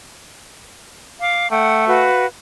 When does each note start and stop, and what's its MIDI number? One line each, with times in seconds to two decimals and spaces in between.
1.21 1.50 77
1.21 1.50 86
1.52 2.05 57
1.52 1.87 78
1.52 1.87 79
1.87 2.25 66
1.87 2.25 71
1.87 2.25 77